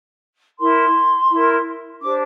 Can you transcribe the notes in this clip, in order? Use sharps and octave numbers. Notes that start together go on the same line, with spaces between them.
E4 A#4 C6
E4 A#4
D4 G4 C5 D6